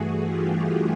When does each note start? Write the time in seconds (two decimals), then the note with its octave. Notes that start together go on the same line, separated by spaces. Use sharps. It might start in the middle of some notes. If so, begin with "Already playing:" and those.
Already playing: G2 E3 A3 F#4 G#4
0.23 F4 G4